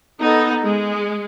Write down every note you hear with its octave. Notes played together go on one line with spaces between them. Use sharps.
B3 D#4 A4
G#3